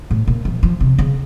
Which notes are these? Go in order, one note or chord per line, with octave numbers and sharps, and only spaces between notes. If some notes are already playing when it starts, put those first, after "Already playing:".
A2
A#2
F3
F3
C3
C#3